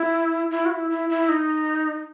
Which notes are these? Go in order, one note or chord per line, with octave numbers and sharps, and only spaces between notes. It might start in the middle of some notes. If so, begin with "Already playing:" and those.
Already playing: E4
E4
F#4
E4
E4
E4
D#4